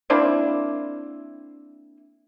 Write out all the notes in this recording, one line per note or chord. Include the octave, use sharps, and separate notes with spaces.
A#3 C4 D4 E4